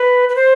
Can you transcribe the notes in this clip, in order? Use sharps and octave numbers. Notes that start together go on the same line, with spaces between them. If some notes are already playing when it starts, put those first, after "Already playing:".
Already playing: B4
B4
C5